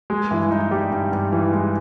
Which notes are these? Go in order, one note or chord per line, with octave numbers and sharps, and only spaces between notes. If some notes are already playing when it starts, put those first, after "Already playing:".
G#3 G#4
G2 E3 E4
E3 D#4
G3 G#3 G4
G2
G2
E3
G#3